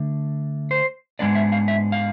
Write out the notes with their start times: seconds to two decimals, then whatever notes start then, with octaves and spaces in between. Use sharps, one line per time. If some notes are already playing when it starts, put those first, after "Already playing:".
Already playing: D3 A3 D4
0.71 C5
1.19 G#2 G#3 B3 D4 D5
1.35 E5
1.52 F5
1.68 E5
1.92 F5